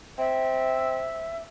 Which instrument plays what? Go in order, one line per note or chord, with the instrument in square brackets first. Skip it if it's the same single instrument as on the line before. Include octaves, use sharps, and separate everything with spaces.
[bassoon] C4 [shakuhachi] E5